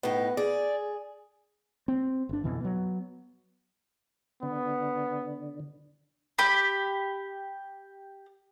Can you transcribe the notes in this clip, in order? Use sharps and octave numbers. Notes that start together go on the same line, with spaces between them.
A2 B3 D#4
G#4 D5
C4
G1 D4
F2 B2 E3
F#3 B3
D3 B3
G4 B5